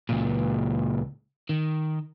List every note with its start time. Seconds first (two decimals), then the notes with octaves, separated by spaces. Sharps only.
0.09 C#2 A#2
1.49 D#3